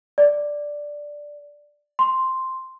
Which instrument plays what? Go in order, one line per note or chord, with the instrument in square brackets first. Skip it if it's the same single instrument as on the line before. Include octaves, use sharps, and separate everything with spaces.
[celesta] D5
C6